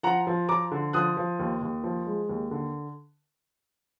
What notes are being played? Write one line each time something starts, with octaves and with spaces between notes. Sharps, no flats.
F3 F#5 A#5
F3
F3 A#5 D6
D3
F3 D#6 F#6
F3
D#2
D#2
F3
G#3
D#2
D3